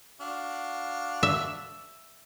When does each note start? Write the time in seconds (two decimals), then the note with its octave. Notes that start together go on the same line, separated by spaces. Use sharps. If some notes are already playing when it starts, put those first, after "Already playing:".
0.21 D4 F#4 F5
1.23 E5